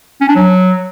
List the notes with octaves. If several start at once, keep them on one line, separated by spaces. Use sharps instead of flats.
C#4
D4
F#3